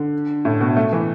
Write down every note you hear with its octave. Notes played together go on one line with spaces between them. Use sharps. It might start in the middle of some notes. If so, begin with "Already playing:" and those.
Already playing: D3
A2
B2
A3
E3